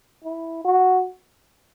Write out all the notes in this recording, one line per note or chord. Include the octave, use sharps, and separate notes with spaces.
E4
F#4